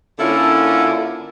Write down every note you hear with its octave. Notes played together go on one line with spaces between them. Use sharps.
D3 A#3 C#4 E4 F4 A4